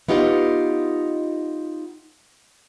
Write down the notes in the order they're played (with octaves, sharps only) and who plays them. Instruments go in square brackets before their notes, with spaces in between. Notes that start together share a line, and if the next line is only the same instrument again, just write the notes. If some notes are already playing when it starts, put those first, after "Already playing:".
[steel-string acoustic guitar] B3 D#4 F4 G4 D#5 F#5